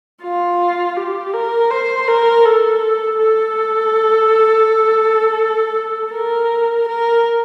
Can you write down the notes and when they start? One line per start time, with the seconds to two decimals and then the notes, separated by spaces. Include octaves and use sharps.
0.22 F4
0.96 G4
1.34 A#4
1.70 C5
2.08 A#4
2.45 A4
3.18 A4
6.14 A#4
6.88 A#4